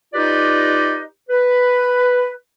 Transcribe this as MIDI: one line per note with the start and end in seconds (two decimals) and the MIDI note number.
0.14 1.01 63
0.14 1.01 65
0.14 1.01 67
0.14 1.01 71
0.14 1.01 74
0.14 1.01 75
1.29 2.30 71